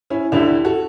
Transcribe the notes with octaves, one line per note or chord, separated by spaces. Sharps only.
C#4 E4
D2 D3 E4 G4
F#4 A4